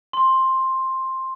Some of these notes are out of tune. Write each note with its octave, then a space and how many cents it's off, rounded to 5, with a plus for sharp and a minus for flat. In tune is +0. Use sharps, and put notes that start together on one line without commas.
C6 +10